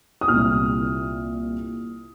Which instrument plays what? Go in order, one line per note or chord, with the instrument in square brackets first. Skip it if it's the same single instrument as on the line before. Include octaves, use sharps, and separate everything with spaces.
[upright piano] D#6
C2 A#2 F6